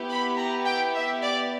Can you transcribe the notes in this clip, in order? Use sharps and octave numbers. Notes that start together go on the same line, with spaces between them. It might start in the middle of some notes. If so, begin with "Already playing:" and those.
Already playing: B3 E4 G4
B5
A#5
G5
E5
D5